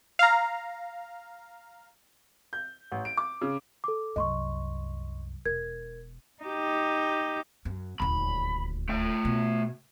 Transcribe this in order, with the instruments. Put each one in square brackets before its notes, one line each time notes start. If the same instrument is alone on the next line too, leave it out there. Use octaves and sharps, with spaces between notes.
[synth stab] F5 A#5
[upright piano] G6
A1
D7
D6
C#3
[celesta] A4 D6
[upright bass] C2 F#2 [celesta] D#5 C6 C#6
[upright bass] E1 [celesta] A#4 G#6
[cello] D#4 G4
[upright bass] F#2
[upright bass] D#1 D2 [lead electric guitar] B5
[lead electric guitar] A3 G5
[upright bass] B2